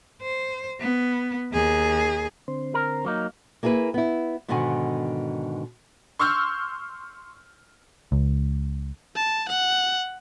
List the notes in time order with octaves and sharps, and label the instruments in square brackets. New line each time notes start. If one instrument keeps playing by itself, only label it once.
[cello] C5
B3
D#2 G#4
[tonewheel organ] D3 C4 C5
[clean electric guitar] A#4
F#3 A#3 D#4
[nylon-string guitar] A#3 E4 G#4 A4 B4
B3 E4
G#2 B2 D3 D#3 F#5 G#5
[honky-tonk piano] C6 C#6 E6 F6 G6
[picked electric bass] C#2
[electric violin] A5
F#5